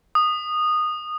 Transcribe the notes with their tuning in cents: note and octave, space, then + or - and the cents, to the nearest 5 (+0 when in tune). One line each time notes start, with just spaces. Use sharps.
D#6 -15